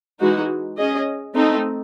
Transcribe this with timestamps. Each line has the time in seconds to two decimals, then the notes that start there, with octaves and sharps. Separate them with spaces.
0.20 E3 G#3 D#4 F#4
0.78 C#4 G#4 D#5
1.35 A3 C4 D#4